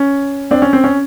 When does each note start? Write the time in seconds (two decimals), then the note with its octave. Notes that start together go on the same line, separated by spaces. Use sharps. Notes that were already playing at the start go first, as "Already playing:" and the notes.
Already playing: C#4
0.51 C4 D4
0.62 C#4
0.73 C4
0.84 C#4